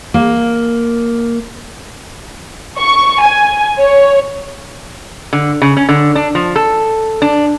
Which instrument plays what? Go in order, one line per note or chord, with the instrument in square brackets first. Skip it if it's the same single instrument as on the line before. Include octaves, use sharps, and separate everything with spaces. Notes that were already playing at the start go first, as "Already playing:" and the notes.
[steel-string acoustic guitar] A#3
[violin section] C#6
G#5
C#5
[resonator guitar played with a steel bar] D3
C#3
C#4
D3
D4
F3
A4
D4